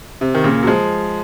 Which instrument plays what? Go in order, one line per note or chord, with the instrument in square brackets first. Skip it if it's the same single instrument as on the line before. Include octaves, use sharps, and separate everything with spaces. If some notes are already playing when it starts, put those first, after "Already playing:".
[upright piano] C3
D#3
A#2 C#3
F#3
F3 G#3